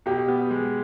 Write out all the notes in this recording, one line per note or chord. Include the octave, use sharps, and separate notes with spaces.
B2 G4
B3
G#3